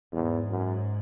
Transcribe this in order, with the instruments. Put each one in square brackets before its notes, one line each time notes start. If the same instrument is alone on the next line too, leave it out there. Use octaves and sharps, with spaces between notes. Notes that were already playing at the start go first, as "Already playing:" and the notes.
[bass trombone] E2 [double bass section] G#2
[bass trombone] F#2